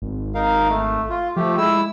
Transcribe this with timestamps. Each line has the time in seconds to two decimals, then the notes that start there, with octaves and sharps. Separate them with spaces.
0.02 G#1
0.35 D#4 A#4 F5
0.69 A3
1.10 F4
1.36 F3 A3 G4
1.58 G#3 E4 E6